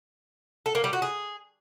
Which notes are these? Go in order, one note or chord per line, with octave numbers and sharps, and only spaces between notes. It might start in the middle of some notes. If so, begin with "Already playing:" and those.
A4
A#3
G3
F#4
G#4